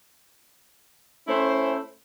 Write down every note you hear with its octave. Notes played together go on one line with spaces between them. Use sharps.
A3 C#4 E4 C5